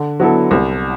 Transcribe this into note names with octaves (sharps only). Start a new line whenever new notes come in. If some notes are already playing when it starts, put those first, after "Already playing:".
Already playing: D3
F#3 B3 E4 A4
C2